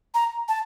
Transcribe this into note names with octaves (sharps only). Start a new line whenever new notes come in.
A#5
A5